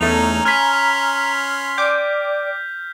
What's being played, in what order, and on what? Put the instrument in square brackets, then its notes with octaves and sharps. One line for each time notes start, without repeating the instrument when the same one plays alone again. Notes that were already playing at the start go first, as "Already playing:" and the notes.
[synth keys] E2 A3 [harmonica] C#4 D#4 [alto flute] A#5 [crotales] F7
[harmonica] C#4 C6 [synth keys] G#5 B5 [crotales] F6 B6
[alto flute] D5 [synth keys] G5 D6 [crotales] G6